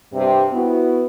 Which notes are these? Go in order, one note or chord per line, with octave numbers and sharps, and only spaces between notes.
G2 C3
B3 E4 F#4